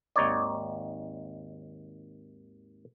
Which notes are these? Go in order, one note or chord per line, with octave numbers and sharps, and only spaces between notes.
G#1 D#2 D#4 C#5 D5